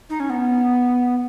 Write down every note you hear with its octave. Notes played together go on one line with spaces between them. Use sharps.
D#4
C#4
B3